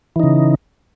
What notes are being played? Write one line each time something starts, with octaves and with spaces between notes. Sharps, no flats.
C#3 E3 D#4